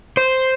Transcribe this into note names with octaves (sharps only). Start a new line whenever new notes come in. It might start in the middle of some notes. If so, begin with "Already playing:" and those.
C5